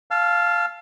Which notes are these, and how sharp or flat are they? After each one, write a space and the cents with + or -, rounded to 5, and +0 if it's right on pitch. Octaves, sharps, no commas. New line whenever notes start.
F5 +0 A5 -15 E6 +45